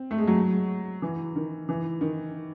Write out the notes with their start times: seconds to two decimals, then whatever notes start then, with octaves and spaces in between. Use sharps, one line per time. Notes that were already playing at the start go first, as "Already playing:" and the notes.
Already playing: C4
0.11 A3
0.18 G#3
0.27 F#3
1.02 E3
1.36 D#3
1.69 E3
2.01 D#3